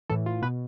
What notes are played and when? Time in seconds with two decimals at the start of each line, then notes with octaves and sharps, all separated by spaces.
0.10 A2 E3 A4
0.26 F4
0.42 B2 B4